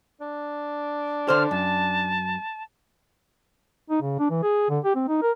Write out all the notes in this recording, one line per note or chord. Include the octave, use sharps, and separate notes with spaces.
D4
D3 C5 F6
F#2 A5
D#4
C#3
D4
E3
G#4
D3
G4
C4
D#4
A#4